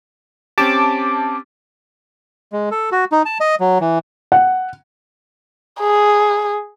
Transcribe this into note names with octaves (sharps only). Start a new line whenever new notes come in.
C4 C#4 G4 A5 D6
G#3
A4
F#4
D#4
A5
D#5
F#3
E3
F#5
G#4